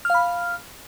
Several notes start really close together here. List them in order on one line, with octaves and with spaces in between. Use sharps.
F6 F5 B5